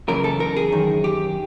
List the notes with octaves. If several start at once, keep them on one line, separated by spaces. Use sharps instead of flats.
F#2 C#3 E3 A#4
A4
A#4
G#4
F#2 D#3
G4